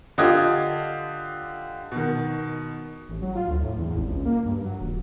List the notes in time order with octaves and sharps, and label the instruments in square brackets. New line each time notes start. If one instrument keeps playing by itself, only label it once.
[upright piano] D3 F4 G4 D#5 D#6 G#6
B2 D#3
[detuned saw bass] A1
F#3
F4
D2
A2
E2
G#1
C#2
A#3
G2
F#3
D#1